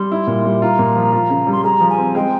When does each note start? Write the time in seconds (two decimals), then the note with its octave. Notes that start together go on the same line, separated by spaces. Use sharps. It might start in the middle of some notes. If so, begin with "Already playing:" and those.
Already playing: G3 C6
0.12 E4
0.27 A#2
0.45 G3
0.62 F4 A#5
0.79 A#2
0.96 F3
1.12 F4
1.30 C#3
1.47 G3 C6
1.64 G#4 A#5
1.80 F3
1.89 G#5
1.98 C4
2.15 G#3 G5